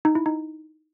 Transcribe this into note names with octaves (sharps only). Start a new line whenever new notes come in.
D#4
E4
D#4